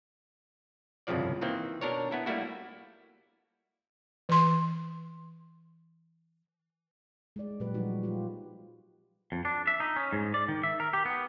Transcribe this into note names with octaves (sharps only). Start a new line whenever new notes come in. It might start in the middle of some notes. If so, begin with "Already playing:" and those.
G1 C2 F2 C#3 F3 D5
D#3 E3 A#3 C4
B2 D4 A#4 C#5
B3 E4 A4
G3 A3 A#3 E4 F#4
E3 C6
G#3 D5
A#2 F#3 G4 B4
F3 G3 D#4 F#4
F4 G4
F2
D4
E5
D#4
C#4
G#2
D5
D#3
E5
A#4
G4
B3